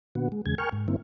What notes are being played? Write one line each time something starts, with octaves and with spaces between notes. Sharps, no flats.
A#2 D3 B3 F#4
G#3
E2 C#3 G#3 G#6
A#4 G5 G#5 C#6 F6
G#2
G2 D3 A#3 C4 E4